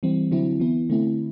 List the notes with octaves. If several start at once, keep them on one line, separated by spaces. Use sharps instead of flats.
E3 G3 C4
D3 F#3 C4 E4
E3 B3 E4
D3 A3 C4 E4